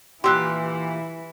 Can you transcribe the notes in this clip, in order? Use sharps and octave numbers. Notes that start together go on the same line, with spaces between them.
A#2 E3 E4 G4 C6 E6 F#6